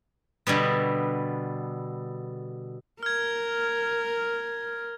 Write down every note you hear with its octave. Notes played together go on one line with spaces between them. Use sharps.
B2 D3 G3 B3
A#4 F6 G#6